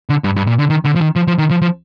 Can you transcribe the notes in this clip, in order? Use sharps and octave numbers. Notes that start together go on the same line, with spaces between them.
D3
G2
G2
A#2
D3
D#3
D3
F3
D#3
F3
F3
D#3
F3
F3